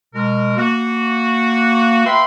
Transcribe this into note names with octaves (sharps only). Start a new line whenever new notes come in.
B2 G#3 A#4
A#3 F#4
B4 E5 F5 G5 B5 C6